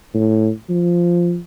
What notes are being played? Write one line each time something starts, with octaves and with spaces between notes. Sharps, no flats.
A2
F3